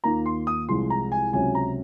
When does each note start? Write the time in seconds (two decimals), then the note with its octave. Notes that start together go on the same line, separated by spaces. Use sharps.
0.04 D#2 D#3 A#3 F4 A#5
0.26 C6
0.47 D#6
0.69 C2 C3 F3 G#3 C6
0.90 A#5
1.12 G#5
1.33 C#2 C3 F#3 C#4 G#5
1.55 A#5